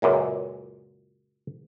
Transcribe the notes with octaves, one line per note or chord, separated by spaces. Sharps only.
C#2 F#2 A#2 G#3